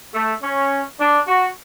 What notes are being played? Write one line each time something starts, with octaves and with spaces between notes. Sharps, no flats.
A3
C#4
D4
F#4